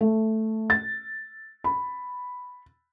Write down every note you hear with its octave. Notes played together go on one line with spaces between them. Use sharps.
A3
A6
B5